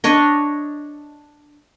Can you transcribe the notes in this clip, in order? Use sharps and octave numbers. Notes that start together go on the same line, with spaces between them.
D4 C#5 D#5